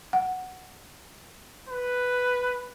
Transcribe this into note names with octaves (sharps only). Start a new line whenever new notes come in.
F#5
B4